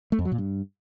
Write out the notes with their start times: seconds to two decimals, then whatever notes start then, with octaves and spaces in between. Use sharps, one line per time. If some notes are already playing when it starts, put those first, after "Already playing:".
0.12 A3
0.19 F2
0.25 F#3
0.32 A#2
0.38 G2